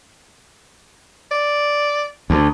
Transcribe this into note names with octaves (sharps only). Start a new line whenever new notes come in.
D5
D2